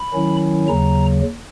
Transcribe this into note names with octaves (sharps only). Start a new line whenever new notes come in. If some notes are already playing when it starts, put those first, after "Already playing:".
Already playing: B5
D#3 F#3 C#4 E4
D#2 C#3 F#3 A#5